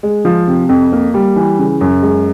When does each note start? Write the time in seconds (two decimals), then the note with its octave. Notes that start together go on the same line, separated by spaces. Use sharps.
0.03 G#3
0.25 F3
0.47 C3
0.69 F2
0.92 A#3
1.14 G3
1.36 E3
1.59 C#3
1.81 F#2
2.02 G#3